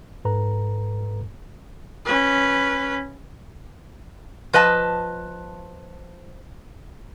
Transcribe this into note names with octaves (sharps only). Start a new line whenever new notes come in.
G#2 A4 B4 A#5
C#4 B4
F3 B4 D#5 A5